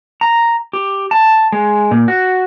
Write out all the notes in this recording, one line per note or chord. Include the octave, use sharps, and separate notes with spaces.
A#5
G4
A5
G#3
A#2
F#4